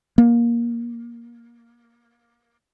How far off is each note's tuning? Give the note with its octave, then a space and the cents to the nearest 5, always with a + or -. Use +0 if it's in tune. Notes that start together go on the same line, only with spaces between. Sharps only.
A#3 +15